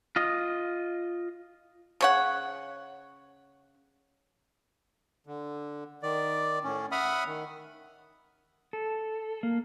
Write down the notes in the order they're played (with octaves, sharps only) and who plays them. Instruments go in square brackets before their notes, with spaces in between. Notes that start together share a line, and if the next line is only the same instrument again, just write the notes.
[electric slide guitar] F4 D#5
[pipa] C#3 C#5 F#5
[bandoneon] D3
D#3 D5
A2 C#4
E5 F#5 B5 D#6 F6
D#3
[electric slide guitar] A4
A#3